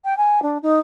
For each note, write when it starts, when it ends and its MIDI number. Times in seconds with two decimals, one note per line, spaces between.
0.05 0.17 79
0.17 0.40 80
0.42 0.58 62
0.63 0.79 63